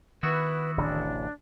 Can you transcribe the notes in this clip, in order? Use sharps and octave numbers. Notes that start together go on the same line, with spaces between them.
D#3 B3 E4 F#4 B4
D1 A1 C3 D4